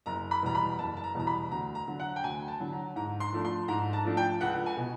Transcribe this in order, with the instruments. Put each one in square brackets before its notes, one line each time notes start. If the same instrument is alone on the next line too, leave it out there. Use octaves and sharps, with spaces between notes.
[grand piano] F#1 A#5
B5
E2 B2 G3 A#5
B5
F#1 A5
A5
A#5
E2 B2 G3 A#5
B5
D2 A#5
A#5
D3 F#3
F#5
G5
D2 G#5
A5
D3 F#3
A#5
G#2 A#5
C6
F3 A3 D4
C6
G#2 A#5
A5
F3 A3 D4
G5
C#2 F#5
G#5
B2